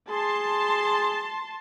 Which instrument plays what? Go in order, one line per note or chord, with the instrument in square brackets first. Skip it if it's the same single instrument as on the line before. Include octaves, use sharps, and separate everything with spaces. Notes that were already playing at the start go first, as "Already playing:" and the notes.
[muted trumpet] G#4 [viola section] A5 C6